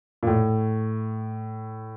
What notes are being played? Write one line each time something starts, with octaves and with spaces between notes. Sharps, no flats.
A#2
A2